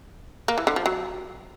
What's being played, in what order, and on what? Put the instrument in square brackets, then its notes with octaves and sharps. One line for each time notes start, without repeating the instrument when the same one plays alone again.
[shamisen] A#3
E3
D3
F3
F#3